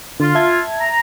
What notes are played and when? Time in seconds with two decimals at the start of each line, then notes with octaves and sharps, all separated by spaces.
0.20 D3 F4
0.35 E5 A5 G#6
0.79 A#5